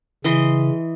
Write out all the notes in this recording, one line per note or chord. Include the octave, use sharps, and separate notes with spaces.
C#3 E3 D#5 C6